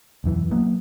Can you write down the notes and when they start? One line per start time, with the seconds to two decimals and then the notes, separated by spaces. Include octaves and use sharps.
0.24 E1 F#2 E3
0.51 F#3 A#3 B3